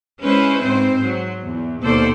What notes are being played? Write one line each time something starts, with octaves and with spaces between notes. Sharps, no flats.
G#3 C#4 E4 B4 C5
G#2 C4 C5
F#3
E2
D#2 B2 A#3 A4 C5 D5